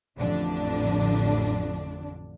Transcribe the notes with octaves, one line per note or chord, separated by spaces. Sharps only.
A1 F2 D3 D4